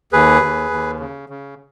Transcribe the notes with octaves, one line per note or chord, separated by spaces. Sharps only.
D#2 G#4 B4
D#2
D#2
C#3
C#3